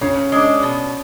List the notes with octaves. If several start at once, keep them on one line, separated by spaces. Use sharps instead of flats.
C#3 C#4
G#3 D4
B2